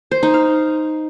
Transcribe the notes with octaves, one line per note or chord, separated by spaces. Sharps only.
C5
D#4
F5